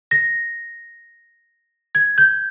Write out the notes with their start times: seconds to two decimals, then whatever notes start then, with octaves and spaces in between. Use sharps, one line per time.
0.11 A#6
1.95 G#6
2.18 G6